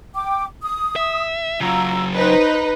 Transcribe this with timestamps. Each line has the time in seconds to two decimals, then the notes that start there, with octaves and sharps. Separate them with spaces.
0.15 G5 D6
0.62 D#6
0.96 E5
1.60 C#3 F#3 F4 A#5 E6
2.15 D#4 B4 C5